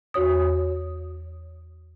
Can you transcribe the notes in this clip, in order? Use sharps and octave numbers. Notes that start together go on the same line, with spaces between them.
E2 F#4 C#5 D#6